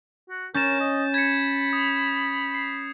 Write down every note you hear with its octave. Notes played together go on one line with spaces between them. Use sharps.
F#4
C#4 A#4 G6 A6 E7
D#5
B5 G#6 C#7
D#6
C7